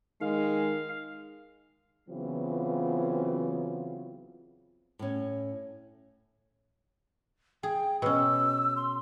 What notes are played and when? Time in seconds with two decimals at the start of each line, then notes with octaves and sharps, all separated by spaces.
0.21 D#3 G#3 F5
2.08 C#3 E3 F#3 B3 C4 F4
4.99 A2 C#4
7.63 G#4 G5
8.02 B2 C#4 E6
8.76 C6